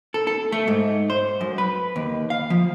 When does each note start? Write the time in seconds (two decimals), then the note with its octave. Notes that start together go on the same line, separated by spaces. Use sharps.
0.14 A4
0.27 A4
0.52 A3
0.68 G#2
1.10 C5
1.41 F#2
1.58 B4
1.96 D#2
2.30 F5
2.50 F3